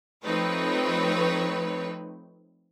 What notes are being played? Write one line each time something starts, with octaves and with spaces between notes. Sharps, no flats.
F3 A3 C4 D#4 B4 C#5